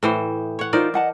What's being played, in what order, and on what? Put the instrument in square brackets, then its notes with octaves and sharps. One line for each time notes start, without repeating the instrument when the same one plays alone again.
[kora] A2 E3 C5
C#5 F#5
[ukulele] D#4 F4 [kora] A#4 C5 D5
[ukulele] D#5 F#5 A5